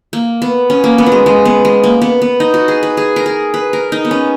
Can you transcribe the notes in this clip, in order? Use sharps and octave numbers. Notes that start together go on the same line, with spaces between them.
A#3
B3
C#4
A#3
B3
F#3
G#3
G#3
B3
G#3
A#3
B3
B3
D#4
F#4
G#4
B4
G#4
A#4
G#4
B4
A#4
D#4
B3
C#4